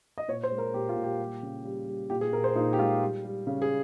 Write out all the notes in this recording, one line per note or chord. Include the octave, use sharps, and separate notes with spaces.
D#5
A#2 C#5
C5
G#3
A#4
A#2 G4
F4
A#2
G4
G3
C#3
G3
G3
A#2 G4
G#4
A#2 A#4
C5
A#2 D#4
G4
G#3 F4
G3
G3
C#3
G#4